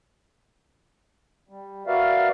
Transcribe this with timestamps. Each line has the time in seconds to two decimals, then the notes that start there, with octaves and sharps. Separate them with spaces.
1.49 G3
1.87 F#4 A#4 B4 D5 E5 F5